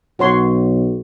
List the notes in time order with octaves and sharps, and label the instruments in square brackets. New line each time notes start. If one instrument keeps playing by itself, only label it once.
[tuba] B1 [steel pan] F#4 C#5 C6